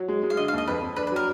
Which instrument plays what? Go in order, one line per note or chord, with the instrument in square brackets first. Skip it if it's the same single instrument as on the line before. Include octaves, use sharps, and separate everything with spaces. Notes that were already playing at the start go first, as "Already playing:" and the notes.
Already playing: [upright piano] F#3
G#3
G#3
[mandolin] F5
[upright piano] D3 [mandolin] D#5
[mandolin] F5
[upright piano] D#2 [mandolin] D#5
[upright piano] F2 [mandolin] B4
[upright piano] F2
[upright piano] D4 [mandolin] B4
[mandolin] B4
[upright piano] F#3 [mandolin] A#4